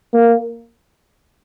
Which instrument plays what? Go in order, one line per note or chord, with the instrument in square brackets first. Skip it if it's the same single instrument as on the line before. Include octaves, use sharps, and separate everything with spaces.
[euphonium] A#3